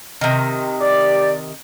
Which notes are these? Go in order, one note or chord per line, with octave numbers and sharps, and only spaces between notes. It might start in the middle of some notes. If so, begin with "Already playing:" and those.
C3 D#3
G4 D5